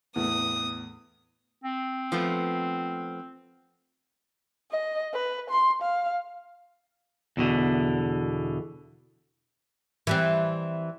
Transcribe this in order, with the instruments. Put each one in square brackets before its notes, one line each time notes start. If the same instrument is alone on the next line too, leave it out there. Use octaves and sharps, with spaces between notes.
[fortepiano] E2 A2 [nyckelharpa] D#6
[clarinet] C4
[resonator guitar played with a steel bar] F3 A3 B3
[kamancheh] D#5
B4
C6
F5
[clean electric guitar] E2 B2 D3
[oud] E3 G3 C4